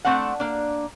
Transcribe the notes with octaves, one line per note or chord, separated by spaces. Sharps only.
A3 C4 D4 F#5
A#3 D4